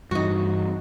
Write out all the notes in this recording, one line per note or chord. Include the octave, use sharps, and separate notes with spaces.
G2 E3 D#4 F#4